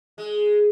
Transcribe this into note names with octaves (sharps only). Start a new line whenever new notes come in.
G#3